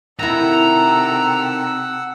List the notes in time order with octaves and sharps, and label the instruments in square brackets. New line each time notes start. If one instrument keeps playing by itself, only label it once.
[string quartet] C3 G4 A4 [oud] D#3 E4 [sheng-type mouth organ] F#5 E6 [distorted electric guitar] A#5